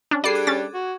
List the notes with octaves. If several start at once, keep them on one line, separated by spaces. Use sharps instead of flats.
C#4 D4
G3 D4 G#4 A4 D5 B5 C7
D6 F#6 G#6
C#4 A6
F#4